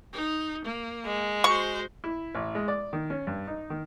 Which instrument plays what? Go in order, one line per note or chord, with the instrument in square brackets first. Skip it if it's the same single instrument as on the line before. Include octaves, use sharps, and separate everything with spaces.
[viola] D#4
A#3
[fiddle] G#3
[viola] F#4 C5 [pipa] C#6
[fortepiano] E4
A1
G#3
D5
D#3
C#4
G2
D#4
D#3